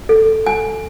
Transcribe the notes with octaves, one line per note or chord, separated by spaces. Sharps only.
A4
G#5